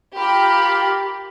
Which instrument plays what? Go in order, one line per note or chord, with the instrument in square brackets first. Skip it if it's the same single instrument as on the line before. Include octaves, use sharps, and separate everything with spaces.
[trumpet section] F4 A#4 B5 [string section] G4